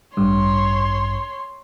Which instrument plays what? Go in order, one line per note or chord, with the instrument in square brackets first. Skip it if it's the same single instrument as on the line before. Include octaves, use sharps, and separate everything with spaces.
[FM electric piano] A1 G2 [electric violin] C#5 C6